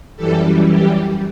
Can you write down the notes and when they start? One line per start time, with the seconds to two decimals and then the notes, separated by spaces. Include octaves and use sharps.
0.17 F#2 E3 G3 A4
0.70 G4